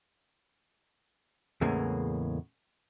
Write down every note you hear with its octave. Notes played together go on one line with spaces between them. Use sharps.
E2 A2 C#3 G#3 A#3